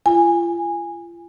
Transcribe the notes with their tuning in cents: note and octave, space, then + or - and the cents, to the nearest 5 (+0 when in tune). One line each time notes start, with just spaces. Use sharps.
F4 -35 G#5 -15